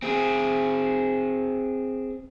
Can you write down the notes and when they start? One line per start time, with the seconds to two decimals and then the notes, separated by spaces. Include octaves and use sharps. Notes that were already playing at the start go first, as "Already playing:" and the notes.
0.02 C4 G#4